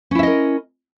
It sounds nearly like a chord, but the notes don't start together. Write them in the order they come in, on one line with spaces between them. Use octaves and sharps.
C#4 E4 E5 D#5 A#4